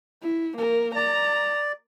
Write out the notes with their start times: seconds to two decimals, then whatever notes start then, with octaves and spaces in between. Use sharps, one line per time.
0.22 E4
0.57 A#3 A#4
0.95 D5 A#5